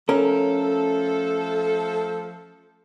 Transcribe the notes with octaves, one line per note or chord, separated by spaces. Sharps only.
F3 A3 C#4 A4 A#4